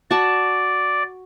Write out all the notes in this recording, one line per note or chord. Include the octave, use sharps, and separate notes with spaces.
F#4 D5 A5